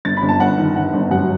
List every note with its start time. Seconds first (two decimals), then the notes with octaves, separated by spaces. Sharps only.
0.05 G1 A6
0.17 B5
0.23 G1
0.29 A5
0.40 G1 F#5
0.58 D#3
0.76 D#3 F#5
0.94 G1
1.11 F#2 F#5